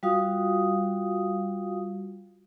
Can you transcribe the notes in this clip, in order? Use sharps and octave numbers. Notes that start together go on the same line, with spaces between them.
G3 F4 F#4 F5 D#6